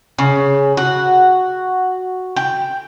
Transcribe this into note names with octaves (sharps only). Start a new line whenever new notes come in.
C#3
F#4
G5